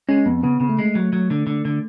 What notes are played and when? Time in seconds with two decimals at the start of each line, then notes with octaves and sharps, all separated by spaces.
0.09 G#3 C#4
0.26 F2 B3
0.44 C#3 B3
0.60 C#3
0.69 A3
0.79 G#3
0.95 F#3
1.13 F#3
1.31 D3
1.47 D3
1.65 D3